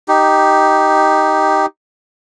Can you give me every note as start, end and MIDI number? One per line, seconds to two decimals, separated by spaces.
0.08 1.66 63
0.08 1.66 67